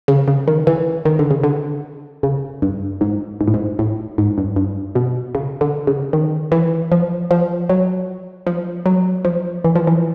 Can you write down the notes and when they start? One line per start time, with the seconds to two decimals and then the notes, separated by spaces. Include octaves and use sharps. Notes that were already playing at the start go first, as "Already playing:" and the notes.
0.08 C#3
0.28 C#3
0.48 D#3
0.67 E3
1.05 D#3
1.19 D3
1.31 C#3
1.44 D3
2.23 C#3
2.62 G2
3.01 G#2
3.41 G#2
3.48 A2
3.54 G#2
3.79 A2
4.18 G#2
4.38 G2
4.56 G2
4.95 B2
5.35 C#3
5.61 D3
5.87 C#3
6.13 D#3
6.52 E3
6.92 F3
7.31 F3
7.69 F#3
8.47 F3
8.86 F#3
9.25 F3
9.64 E3
9.75 F3
9.87 E3